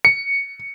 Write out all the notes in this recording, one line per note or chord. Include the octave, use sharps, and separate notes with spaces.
C#7